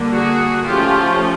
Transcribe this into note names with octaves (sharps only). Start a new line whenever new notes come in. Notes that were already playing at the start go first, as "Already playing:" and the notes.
Already playing: D3 G3 A#3 D4
F#4 G#4
F3 A3 C#4 F4 G4